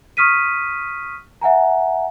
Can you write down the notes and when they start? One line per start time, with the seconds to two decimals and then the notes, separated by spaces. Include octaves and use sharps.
0.17 C#6 D#6 F6 B6 D#7
1.41 E5 F#5 G#5 A#5